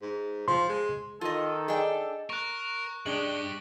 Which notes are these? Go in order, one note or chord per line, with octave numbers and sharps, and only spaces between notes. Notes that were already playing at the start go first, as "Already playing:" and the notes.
G#2
F3 C6
G#3
D#3 F4 A4 D#5
D4 G#4 D#5 G5 G#5
A#4 C#6 F#6
G2 G#3 D4 G4 F#7 G7